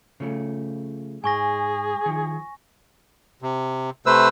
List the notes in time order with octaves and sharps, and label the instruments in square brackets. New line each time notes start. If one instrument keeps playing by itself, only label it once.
[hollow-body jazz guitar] C#3 F3 A3
[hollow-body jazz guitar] G#2 [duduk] G#4 [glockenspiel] G#5 C#6 A#6
[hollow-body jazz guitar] D#3 F3
[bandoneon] C3
C3 A3 B4 C5 E6